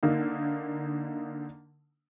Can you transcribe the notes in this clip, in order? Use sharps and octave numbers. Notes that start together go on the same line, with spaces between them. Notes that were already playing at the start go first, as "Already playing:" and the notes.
D3 A#3 D#4